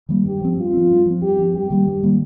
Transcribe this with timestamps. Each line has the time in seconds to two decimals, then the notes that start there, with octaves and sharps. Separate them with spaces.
0.09 D#3 G3 A#3
0.26 G2 G4
0.42 F3 C4
0.57 G2 F4
0.74 F3 C4
0.90 G2
1.06 F3 C4
1.22 G2 G4
1.39 F3 C4
1.54 G2 G4
1.70 D#3 G3 A#3
1.88 G2
2.03 D#3 G3 A#3